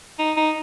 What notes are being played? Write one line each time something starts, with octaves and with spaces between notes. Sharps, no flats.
D#4
D#4